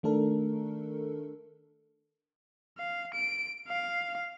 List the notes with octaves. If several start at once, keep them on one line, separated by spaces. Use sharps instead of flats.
D#3 A3 D4 A4 A#4
F5
D7
F5